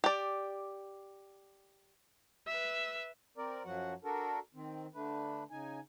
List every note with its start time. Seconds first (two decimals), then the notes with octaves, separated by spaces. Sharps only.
0.04 G4 D5
2.47 B4 E5
3.37 C4 A#4 D5
3.65 F#2 F3 F#3 F#4 F#5
4.04 D4 F#4 A4 A#4
4.54 D#3 C4
4.95 D3 A3 D4 B4
5.50 C#3 D#4 G#5